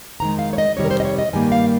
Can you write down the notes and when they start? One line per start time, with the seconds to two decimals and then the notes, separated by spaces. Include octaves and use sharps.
0.20 F2 D#3 G#3 A#5
0.39 F5
0.53 C#5
0.58 D#5
0.76 F2 C3 D#3 G3 C#5
0.85 A#4
0.91 C5
1.00 D#5
1.05 C#5
1.19 D#5
1.33 G2 D#3 G3 A#3 G#5
1.52 F5